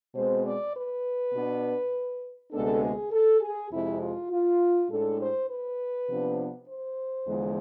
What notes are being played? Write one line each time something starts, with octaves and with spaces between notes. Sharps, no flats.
B2 G#3 C4 C5
D5
B4
B2 B3 D4
D2 C3 G#3 B3 D4 A4
G#4
A4
G#4
F2 C3 G#3 E4
F4
F4
A2 G#3 D4 A4
C5
B4
C3 F3 B3 D4
C5
E2 D3 F3 G#3